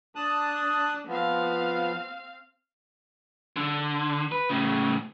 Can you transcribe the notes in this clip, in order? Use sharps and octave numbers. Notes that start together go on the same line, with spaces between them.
D4 A5 D#6 F#6
F3 B3 C4 F5
D3
B4
A2 C#3